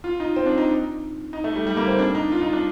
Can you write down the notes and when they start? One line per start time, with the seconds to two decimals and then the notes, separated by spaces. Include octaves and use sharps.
0.04 F4
0.20 D#4
0.36 C4
0.46 D4
0.58 D#4
1.33 D#4
1.44 A3
1.56 G3
1.67 G3
1.77 A#3
1.88 C4
1.99 D4
2.15 D#4
2.32 F4
2.42 D#4
2.53 D4